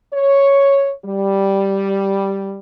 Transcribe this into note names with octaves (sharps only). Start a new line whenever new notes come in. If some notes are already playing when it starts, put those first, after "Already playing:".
C#5
G3